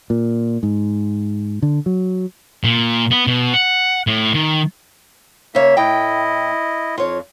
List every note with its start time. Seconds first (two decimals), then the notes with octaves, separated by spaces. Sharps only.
0.10 A#2
0.63 G#2
1.62 D3
1.86 F#3
2.64 A#2
3.11 B3
3.27 B2
3.54 F#5
4.07 A2
4.34 D#3
5.55 C#3 A#3 C#5 E5
5.77 A2 E4 D#5 G5
6.98 F2 F4 C#5